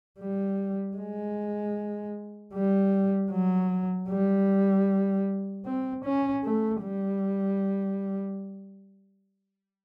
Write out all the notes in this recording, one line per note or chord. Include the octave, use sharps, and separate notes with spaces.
G3
G#3
G3
F#3
G3
C4
C#4
A3
G3